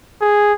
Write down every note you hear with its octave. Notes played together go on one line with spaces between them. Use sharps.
G#4